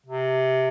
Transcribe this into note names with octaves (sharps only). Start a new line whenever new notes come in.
C3